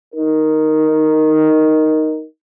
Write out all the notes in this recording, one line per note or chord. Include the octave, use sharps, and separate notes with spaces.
D#4 A#4